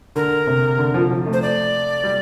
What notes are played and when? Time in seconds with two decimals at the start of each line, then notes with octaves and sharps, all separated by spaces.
0.16 D3 A#4
0.47 C3
0.78 D3
0.94 F3
1.11 F3
1.26 A3
1.33 C5
1.42 D5
2.04 G3